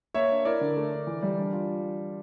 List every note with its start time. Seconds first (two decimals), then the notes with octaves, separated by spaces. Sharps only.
0.14 A#3 C#5 E5
0.31 D4
0.45 E4 A#4 D5
0.61 D3
0.76 A3
0.92 D4
1.07 E3
1.23 G3
1.38 D4
1.53 F4